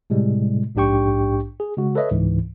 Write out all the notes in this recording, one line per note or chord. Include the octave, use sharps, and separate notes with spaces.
A2 C3 G3 G#3
A#1 G#2 D4 G4 G5 C#6
G#4
C#3 G#3 F#4
A4 B4 C#5 D#5 E5
C#2 G#2 E3